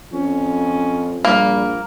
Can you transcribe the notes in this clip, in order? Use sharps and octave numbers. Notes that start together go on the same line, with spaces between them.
F2 C#4
A#1 G3 A#3